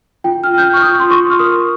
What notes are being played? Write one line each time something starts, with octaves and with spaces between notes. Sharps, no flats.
F4 G5
F6
F4 G6
F6
C#6
F4 D#6
C6
F4 C#6
F6
A#4 D#6